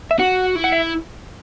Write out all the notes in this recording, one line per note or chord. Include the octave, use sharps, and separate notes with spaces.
E5
F#4 F#5
E4
F#5
E5